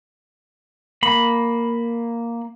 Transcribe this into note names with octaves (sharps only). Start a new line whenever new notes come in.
A#3 B5